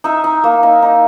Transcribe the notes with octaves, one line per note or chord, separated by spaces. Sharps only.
D#4 E5
D#4
A#3
D#4
D#4